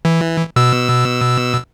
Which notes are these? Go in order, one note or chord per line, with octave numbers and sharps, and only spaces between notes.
E3
B2 E6